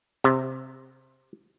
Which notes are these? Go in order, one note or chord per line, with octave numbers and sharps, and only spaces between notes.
C3